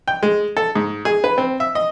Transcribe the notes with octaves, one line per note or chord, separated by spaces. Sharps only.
G5
G#3
A4
G#2
G#4
B4
C4
E5
D#5